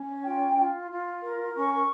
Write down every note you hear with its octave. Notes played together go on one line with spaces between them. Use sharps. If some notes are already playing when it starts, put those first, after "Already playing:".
Already playing: C#4
F4 G5
F4
F4
A#4
C#4 C#6